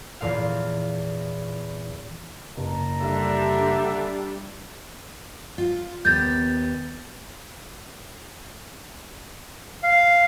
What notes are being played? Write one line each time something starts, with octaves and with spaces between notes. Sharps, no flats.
E2 A#2 F5
F#1 A5 A#5
D3 G3 D4 E5
F4
D#2 B3 G6 A6
F5